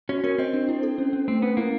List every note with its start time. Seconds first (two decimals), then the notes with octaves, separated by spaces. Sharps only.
0.09 C#4 F#4
0.24 C#4 A#4
0.38 C4 D#5
0.54 D4
0.69 E4
0.83 A4
0.98 C#4
1.13 C#4
1.28 A3 C4
1.42 B3 C#4
1.57 A#3 E4